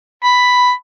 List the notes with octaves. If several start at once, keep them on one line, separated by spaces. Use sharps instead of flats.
B5